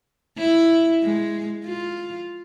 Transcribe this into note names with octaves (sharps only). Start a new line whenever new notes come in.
E4
G#3
F4